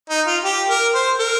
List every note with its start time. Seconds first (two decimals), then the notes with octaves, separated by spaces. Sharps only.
0.10 D#4
0.27 F4
0.44 G4
0.69 A#4
0.94 C5
1.20 A#4